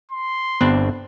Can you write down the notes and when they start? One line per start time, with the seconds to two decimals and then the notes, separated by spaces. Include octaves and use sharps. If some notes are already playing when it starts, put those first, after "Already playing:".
0.11 C6
0.61 G1 B3 C4 D4